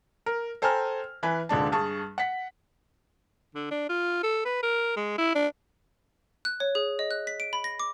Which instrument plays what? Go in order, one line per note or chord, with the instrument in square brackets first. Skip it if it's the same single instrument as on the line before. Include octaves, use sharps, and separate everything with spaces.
[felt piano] A#4
A4 C5 G5 G#5 A#5 F6
E3 B4 G#5
D#1 D3 G#3 D4 A5
G2 G#4 A5 C#6
F#5 B6
[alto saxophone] D3
D4
F4
A4
B4
A#4
G#3
E4
D4
[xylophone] F#6
C#5
G#4
D#5
F#6
B6
D7
B5
A#6
D6